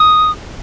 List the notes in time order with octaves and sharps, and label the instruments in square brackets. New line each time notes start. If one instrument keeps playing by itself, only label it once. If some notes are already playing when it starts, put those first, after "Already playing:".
Already playing: [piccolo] D#6